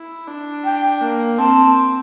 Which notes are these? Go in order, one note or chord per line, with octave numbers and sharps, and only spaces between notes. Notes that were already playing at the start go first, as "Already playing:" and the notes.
Already playing: E4
D4
G5
A#3
C4 A5